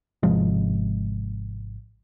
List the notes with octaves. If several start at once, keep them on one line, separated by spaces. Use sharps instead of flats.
G#1 C3 F3 G#3